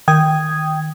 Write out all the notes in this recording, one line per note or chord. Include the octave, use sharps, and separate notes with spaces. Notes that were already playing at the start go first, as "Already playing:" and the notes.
D#3 G5 D#6 G#6